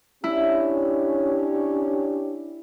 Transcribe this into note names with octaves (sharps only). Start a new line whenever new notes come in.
C#4 D4 E4 G4